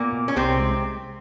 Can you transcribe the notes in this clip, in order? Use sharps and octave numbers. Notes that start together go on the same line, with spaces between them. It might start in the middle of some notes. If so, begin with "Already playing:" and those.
Already playing: A#2 A#3 B3
B2
C#4
C2 C3 C4
G#3